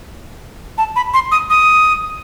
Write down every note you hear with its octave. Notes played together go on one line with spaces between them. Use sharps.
A5
B5
C6
D#6
D#6